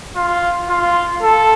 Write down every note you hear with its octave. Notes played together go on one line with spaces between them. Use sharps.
F4
F4
A4